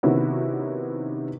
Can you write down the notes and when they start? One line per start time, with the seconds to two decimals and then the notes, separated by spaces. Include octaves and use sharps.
0.03 C3 D#3 B3 C#4 E4 F#4